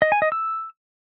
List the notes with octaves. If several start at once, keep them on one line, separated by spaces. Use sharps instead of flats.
D#5
G#5
D#5
E6